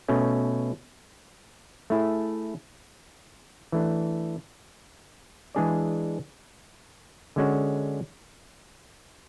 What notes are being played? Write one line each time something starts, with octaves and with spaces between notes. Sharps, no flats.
B2 A3 C#4
A3 E4 G#4
E3 A3 D4
E3 G#3 D4 G#4 D5
D3 G#3 C#4 F#4